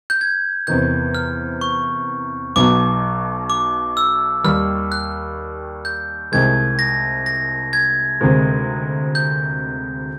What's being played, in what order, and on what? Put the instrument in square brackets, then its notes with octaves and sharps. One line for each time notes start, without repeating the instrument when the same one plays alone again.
[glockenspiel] G6
G#6
[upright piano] E2 C3 D#3 [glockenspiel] G6
[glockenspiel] F6
C#6
[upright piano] B1 B2 F#3 [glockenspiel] D6
[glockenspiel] D6
E6
[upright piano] D#2 D#3 G3 [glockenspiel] F6
[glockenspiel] F#6
G6
[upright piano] C2 C3 D#3 G#3 [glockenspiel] G#6
[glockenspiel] A#6
A#6
G#6
[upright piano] D2 C3 D#3 G#3
[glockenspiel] G6